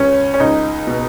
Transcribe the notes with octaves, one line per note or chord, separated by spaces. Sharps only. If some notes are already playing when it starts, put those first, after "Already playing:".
Already playing: C#2 C#4
C#4
C#2 D#4
B2